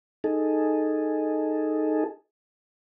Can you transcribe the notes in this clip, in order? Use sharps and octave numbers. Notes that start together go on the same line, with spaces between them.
D#4 G#4 A4